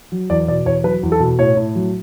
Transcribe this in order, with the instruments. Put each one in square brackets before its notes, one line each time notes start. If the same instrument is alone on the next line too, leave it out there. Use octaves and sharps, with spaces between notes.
[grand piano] F#3
E2 D5
B2 D5
E2 C#5
F#3 B4
E2
A4
B2
A2 C#5
A2
F#3